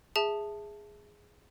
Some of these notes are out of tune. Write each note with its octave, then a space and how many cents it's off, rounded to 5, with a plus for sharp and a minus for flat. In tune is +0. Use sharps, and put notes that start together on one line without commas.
G#4 +0 E5 +0 A5 +0